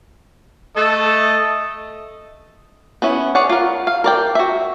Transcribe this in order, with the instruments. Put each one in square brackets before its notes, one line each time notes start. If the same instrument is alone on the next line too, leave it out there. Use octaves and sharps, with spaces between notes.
[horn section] A3 A4 [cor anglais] D#5
[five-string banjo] B3 C#4 E4
G#4 C#5 D5 F#5
F4 A#4
F5
A#4 D5 G5
F#4 E5